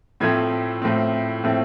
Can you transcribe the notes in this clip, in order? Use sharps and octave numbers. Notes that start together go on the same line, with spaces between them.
A2 F3 A3 C4 G#6
A2 F3 A3 C4
A2 F3 A3 C4